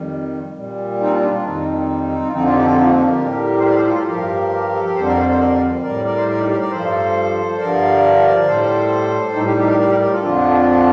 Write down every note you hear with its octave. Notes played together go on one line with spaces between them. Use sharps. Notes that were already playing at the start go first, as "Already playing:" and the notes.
Already playing: F2 D#3 G3
A#2 G3
C4 D#4
D4 F4
D4 F4
D4 F4
F2 D#3 G3 C4 D#4
F4
F2 D3 F3 C4 D#4
D4 F4
D#4 G4
F4 A4
C4 D#4
A#3 D4
A#3 D4
G4 A#4
A2 G3
C5
G4 A#4
D5
A4 C5
F4 A4
G4 A#4
G2 F3 G4 A#4
A4
A#4
F2 D3 G3 A4 C5
A#4 D5
A4 C5
A4 C5
A#4 D5
A2 G3 A#4 D5
A#4 D5
C5
A#4 D5
D#4 G4
G4 A#4
A#4 D5
G2 F3 A4 C5
G2 D3 F3 A#4 D5
A#4
A2 G3 A4 C5
A2 G3 D#4 G4
D#4 G4
D#4 G4
G4 A#4
A#4 D5
G4 A#4
G4 A#4
F4 A4
F2 D3 F3 D4 F4